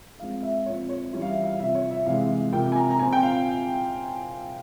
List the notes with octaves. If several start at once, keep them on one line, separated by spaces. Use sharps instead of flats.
F3 G#3 C4 F5
E5
A#2 F3 C4 C#5
C#5
E3 G3 C#4 C#5
F5
E5
F5
C3 F3 C4 E5
C#5
E5
C3 E3 G#3 F5
C3 F3 A#3 G5
G#5
A#5
A#5
A#2 F3 C4 G#5
G5
F5